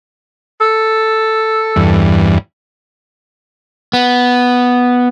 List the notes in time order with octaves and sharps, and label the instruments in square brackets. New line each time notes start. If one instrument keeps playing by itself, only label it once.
[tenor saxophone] A4
[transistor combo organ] E2 G2
[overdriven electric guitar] B3